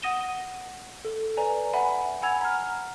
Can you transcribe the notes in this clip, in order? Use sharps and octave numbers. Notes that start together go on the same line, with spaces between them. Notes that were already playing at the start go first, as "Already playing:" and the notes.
F#5 D#6 A#6 D#7 E7 G7
A4
B4 D5 G#5 A#5
E5 F#5 G#5 B5
F#5 G#5 B5 E6 G#6 F7
A#5 F6